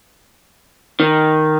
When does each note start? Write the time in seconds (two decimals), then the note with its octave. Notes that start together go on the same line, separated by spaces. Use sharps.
1.00 D#3